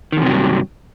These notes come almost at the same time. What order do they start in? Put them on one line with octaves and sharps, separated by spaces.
D#3 E2 C3 F#3 G2